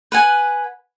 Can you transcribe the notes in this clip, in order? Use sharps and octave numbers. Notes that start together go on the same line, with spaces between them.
B4 F#5 G#5